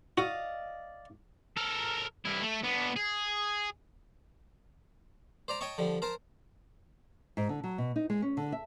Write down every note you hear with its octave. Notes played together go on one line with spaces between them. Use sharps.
F#4 D5 D#5 F5
A4 A#4
G2 E4
A3
B3 D4
G#4
C5 D5 A#5
C#5 D#5 G5 A5 C#6
D3 F3 G3
A#4 C5 A5
G#2
D3
F#3
B2
D#4
G#3
C#4
D3
E5